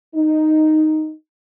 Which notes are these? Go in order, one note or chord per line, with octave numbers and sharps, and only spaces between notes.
D#4